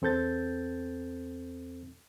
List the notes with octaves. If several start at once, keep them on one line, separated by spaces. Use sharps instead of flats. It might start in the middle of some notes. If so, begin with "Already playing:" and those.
E2 C4 A4 G6 A6